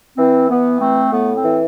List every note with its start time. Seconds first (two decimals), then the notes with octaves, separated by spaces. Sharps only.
0.18 E3 C4
0.49 E3 B3
0.81 A3 C4
1.12 A2 B3
1.36 C4
1.44 E3